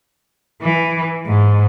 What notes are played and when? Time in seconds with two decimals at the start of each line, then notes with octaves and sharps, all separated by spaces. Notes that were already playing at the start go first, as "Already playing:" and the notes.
0.62 E3
1.26 G#2